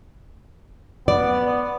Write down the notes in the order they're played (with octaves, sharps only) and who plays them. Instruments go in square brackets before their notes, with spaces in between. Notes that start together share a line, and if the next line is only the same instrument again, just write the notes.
[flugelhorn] B3 [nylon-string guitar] D5